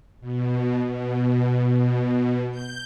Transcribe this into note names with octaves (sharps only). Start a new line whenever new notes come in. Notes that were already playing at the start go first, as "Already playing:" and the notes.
B2
B2
G6